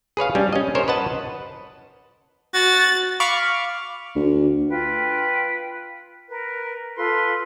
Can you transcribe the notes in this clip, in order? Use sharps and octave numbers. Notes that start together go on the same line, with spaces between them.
G#4 B4 C#5 F5
G3 C#4 D4
C#4 D#5
A#4 C5 C#5
B4 D#5 F#5 A5
F#4 A6
F5 B5 C#6 D6 F6
D2
F4 B4 G5
A#4 B4
F4 A4 B4 C6